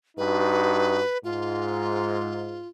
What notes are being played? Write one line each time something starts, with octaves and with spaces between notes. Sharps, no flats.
G2 D#4 F#4 B4
G#2 F4